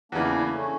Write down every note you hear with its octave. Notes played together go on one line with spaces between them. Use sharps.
E2 C#3 E3 A#3 D4
A3 C#4